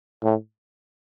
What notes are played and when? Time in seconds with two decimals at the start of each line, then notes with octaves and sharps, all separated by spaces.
0.23 A2